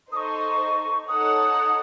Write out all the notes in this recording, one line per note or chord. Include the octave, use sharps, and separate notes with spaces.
D#4 A4 C5 D#5 C#6 D#6
D#4 A4 C#5 F#5 D#6